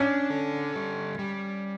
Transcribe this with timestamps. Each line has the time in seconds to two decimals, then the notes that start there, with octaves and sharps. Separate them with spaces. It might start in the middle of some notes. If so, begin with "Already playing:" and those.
Already playing: C#4 D4
0.30 A4
0.75 G3
1.19 G3